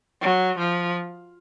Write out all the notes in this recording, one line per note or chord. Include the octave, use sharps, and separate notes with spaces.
F#3
F3